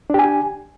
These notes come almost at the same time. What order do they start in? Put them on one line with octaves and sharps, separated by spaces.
D4 G4 G#5